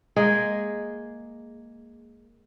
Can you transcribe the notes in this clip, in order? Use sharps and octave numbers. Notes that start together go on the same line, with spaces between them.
G#3 A#3 G#4